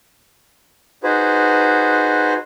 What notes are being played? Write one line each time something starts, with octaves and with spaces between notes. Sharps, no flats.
D#4 F#4 G#4 B4 C5